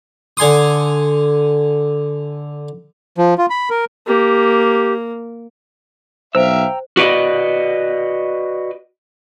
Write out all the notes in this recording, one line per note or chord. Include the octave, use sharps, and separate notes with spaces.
D3 G#5 C6 D#6
F3
F4
B5
A#4
A#3 G4
B1 C5 E5 F5 G5 A#5 E6
F#4 B4 D5 D#5